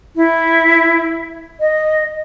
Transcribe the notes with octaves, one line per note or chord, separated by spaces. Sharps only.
E4
D#5